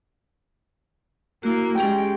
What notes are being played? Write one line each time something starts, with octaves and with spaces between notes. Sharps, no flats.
A#3 E4 F#4
G#3 C#4 G4 G#4 G5